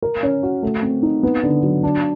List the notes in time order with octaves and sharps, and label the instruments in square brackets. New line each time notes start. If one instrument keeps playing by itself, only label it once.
[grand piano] A#4
C#4
F#4
A3
C4
D#4
B3
D3
F#3
D4